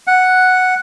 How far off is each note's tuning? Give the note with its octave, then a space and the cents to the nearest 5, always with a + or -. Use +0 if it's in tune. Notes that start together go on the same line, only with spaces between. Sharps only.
F#5 +0